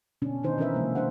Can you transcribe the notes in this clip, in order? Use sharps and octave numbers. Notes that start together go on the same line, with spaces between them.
B2 D3 C#4 D4
D#3 D4 D#4 C5
E3 C#4 D4 A#4 B4 E5
C3 F3 G3 G#3 A#3
D4 C5 E5 F#5